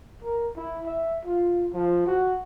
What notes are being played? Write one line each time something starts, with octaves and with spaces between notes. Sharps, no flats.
A#4
E4
E5
F4
F3
F#4